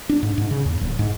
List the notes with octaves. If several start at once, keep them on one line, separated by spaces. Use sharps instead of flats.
D4
G#2
G#2
C#3
E2
D1
G#2